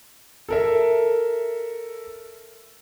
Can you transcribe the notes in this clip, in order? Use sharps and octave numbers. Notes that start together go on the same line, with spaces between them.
A4 A#4 E5